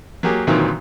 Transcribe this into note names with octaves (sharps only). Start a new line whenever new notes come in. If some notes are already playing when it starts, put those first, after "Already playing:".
F#3 A#3 G4 G#4
D2 A#2 D#3 E3 F#3 C4